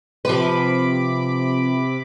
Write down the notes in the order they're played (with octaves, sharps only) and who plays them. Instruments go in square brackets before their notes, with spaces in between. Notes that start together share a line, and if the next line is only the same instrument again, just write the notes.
[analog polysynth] C3 B5 D6 [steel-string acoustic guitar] F3 B4